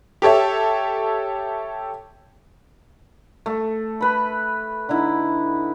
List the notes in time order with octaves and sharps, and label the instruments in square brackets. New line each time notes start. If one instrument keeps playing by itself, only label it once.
[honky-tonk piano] G4 A4 C#5 E5
[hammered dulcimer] A3
B4 B5
D3 D#4 E4